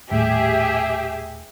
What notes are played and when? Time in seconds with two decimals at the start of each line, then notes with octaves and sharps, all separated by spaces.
0.11 D#1 A2 G4 G#4 E5